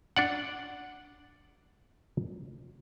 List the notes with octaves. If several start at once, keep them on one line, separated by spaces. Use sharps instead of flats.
D4 D5 F#5